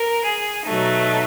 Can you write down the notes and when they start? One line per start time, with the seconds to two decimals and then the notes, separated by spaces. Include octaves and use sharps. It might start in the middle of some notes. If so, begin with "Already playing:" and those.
Already playing: A#4
0.24 G#4
0.66 B2 F#3 A3 D#4